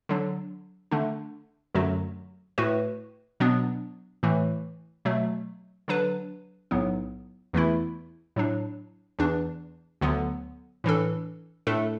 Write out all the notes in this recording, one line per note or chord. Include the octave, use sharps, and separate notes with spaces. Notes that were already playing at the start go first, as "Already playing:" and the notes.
D3 F#3 D4
D3 A3 D4
F#2 D3 F#3 A3 F#4
A2 A3 F#4 B4
B2 F#3 B3 D4
A2 E3 A3
B2 F#3 A3
D3 F#3 D4 B4
B1 A2 F#3 B3
E2 E3 A3 E4
A2 F#3 D4
E2 E3 D4
D2 D3 F#3 B3
A2 E3 D4 A4
A2 A3 D4 A4